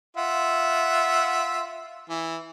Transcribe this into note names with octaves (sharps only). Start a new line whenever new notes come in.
F4 E5 F#5
E3